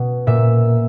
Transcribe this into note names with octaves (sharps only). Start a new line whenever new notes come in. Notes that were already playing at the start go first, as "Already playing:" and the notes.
Already playing: B2
A#2 E5